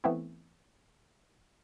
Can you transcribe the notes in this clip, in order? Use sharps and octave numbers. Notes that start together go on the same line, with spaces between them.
E3 A3 B3 C4 E4